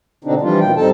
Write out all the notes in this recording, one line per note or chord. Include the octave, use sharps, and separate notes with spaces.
B2 D3 C4 D4 D#4
E3 F3 G3 D4 F4
D#2 B2 D#3 G5
G#2 G3 C4 D#4 A4 A5